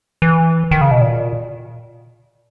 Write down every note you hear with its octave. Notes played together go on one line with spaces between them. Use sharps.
E3
D#3
C#3
B2
A#2